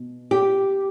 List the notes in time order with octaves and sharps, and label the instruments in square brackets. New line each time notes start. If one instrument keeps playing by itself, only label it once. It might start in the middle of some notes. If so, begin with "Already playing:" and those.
Already playing: [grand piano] B2
[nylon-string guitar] G4